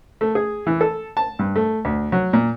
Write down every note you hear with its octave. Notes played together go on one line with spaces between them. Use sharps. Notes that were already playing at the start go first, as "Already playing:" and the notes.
A3
G#4
E3
A4
A5
G2
A3
D2
F#3
A#2